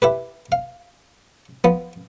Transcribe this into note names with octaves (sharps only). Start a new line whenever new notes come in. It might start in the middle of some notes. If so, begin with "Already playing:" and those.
E4 G4 B4
F5
F3 B3